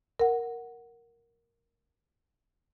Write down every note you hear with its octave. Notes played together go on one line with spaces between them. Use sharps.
A#4 F#5